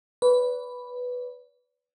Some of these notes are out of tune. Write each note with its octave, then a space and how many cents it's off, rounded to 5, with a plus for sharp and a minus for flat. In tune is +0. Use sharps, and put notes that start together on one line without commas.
B4 +0 D5 -45